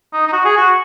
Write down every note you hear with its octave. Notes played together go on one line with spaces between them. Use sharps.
D#4
D#4
F#4
G#4
F#4